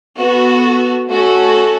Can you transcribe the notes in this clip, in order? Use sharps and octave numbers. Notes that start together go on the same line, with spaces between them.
B3 F#4 A4
A3 C#4 F#4 A4